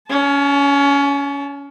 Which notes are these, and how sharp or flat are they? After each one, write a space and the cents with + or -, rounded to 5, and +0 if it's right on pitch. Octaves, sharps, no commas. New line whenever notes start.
C#4 +25 A5 -25